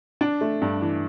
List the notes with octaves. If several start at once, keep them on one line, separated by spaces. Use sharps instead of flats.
D4
A3
G2
E3